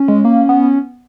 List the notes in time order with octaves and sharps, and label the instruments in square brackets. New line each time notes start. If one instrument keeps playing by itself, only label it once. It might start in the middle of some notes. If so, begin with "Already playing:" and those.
Already playing: [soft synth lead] C#4
[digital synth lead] G#3
A#3
B3